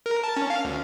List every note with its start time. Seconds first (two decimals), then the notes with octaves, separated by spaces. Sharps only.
0.06 A#4
0.24 A5
0.37 C#4
0.50 F5
0.65 D2